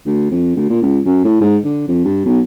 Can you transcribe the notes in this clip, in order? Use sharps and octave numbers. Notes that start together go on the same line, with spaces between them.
D2
F2
D2
A#2
C#2
F#2
A2
G#2
D3
F2
G2
B1